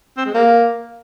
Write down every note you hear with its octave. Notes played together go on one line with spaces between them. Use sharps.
C4
G#3
A#3